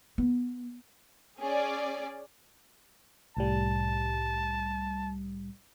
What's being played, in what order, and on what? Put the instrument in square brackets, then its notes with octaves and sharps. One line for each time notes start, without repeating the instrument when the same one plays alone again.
[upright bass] B3
[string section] C#4 G#4 D5
[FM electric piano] C2 A2 G3 [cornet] A5